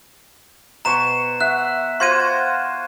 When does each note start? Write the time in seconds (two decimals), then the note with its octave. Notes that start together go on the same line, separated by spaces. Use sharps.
0.85 B2 A#5 C6 C#6 E7
1.41 E5 F#5 F#6
2.00 F4 F#4 C5 C6 G#6 D#7
2.20 A6